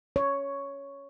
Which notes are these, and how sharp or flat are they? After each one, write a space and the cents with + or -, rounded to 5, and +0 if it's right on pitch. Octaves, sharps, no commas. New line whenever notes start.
C#5 +5